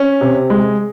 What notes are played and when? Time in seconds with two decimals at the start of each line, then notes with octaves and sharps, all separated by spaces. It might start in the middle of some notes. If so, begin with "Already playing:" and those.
Already playing: C#4
0.21 C3
0.50 G#3